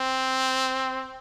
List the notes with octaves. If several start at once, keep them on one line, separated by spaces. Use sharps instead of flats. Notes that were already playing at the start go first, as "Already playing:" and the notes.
Already playing: C4